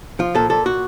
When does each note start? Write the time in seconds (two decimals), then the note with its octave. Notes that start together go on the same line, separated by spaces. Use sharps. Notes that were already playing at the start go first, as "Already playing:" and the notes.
0.19 F3 F4
0.35 A#2 A4
0.50 A#2 A4
0.66 F#4